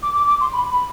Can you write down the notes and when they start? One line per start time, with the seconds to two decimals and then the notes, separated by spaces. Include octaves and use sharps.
0.03 D6
0.15 D6
0.28 D6
0.40 C6
0.53 B5
0.70 B5